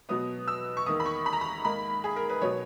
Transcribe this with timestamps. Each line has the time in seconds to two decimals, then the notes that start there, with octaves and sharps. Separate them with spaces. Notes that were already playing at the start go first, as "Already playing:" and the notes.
0.09 B2 F#3 B3 D#6
0.48 E6
0.77 C#6
0.86 E2 D#3 A#3 D#6
1.00 B5
1.06 C#6
1.26 B5
1.33 A#5
1.41 B5
1.65 G#2 D#3 A#3 B5
2.04 G#4
2.16 A#4
2.29 B4
2.41 B2 F#3 B3 C#5